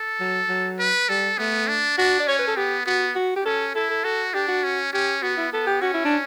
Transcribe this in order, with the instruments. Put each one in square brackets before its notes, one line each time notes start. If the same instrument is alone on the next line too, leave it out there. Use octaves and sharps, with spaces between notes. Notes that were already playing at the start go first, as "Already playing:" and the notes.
Already playing: [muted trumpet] A4
[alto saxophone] F#3
F#3
[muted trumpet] B4
[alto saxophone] G3 [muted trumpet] A4
[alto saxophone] A3 [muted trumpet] B3
[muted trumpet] D4
[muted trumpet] D4 [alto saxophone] F#4
[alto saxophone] D5
[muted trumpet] C#4 [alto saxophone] C#5
[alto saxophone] B4
A4
[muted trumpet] B3 [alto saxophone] G4
[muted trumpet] B3 [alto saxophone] F#4
[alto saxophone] F#4
G4
[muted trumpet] C#4 [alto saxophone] A4
[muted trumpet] E4 [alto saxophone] A4
[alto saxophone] A4
[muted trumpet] F#4 [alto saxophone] A4
[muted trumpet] D4 [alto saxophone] G4
[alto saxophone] F#4
[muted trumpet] C#4
[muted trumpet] C#4 [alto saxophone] G4
[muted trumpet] B3 [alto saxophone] F#4
[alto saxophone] E4
[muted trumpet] B3 [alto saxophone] A4
[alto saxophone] G4
[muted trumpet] C#4 [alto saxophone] F#4
[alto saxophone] E4
D4